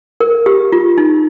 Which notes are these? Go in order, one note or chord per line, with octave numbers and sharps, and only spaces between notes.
A#4
G4
F4
D#4